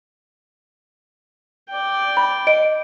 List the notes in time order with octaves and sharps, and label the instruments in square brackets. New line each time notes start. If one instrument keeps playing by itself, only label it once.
[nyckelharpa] D5 G5
[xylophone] B5
D#5 D7